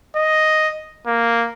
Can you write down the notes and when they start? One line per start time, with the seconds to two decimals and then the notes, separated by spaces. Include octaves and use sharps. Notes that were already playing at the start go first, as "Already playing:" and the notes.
0.16 D#5
1.07 A#3